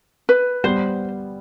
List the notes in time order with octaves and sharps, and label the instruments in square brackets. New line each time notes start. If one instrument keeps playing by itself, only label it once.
[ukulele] B4
[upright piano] G3 B3 [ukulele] C5